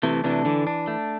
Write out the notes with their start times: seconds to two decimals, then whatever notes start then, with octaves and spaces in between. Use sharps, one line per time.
0.03 C3 E3 A3
0.24 C3 E3 D4
0.45 D3 E3
0.67 D4
0.87 A3